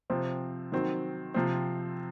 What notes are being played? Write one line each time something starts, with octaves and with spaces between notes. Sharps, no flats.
C3 F3 C4
D#3 F#3 C4
C3 F3 C4